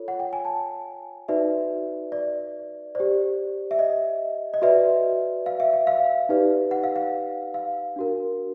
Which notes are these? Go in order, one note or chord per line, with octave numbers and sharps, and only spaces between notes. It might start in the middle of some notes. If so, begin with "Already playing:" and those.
Already playing: F4 A4 C#5
F#5
G5
G#5
A5
D#4 F#4 B4 D5 E5
D5
G4 C5 D5
E5
D#5
D#5
F#4 B4 D5 E5
F5
E5
E5
F5
D#4 G4 B4 D5
F#5
F5
F#5
F5
D4 F#4 A#4